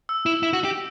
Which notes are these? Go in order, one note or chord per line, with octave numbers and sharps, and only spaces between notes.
E6
E4
E4
F#4
G4